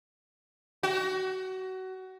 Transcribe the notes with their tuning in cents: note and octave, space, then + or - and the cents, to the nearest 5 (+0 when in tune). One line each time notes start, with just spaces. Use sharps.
F#4 +25